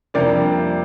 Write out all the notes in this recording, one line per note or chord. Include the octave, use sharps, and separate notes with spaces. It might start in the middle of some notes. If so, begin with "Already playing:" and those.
F2 C3 G3 A#3 D4 D5